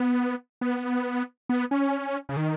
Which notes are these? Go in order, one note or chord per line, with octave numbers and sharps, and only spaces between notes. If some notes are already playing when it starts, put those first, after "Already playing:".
Already playing: B3
B3
B3
C#4
C#3
D#3